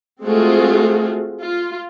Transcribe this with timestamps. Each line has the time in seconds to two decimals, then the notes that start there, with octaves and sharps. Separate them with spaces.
0.24 G#3 A3 C4 F4 F#4 G#4
1.42 F4